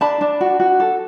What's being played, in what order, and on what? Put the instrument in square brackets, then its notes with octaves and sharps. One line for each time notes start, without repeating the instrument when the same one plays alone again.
[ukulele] D4 A5 B5
D4
F#4
F#4
A4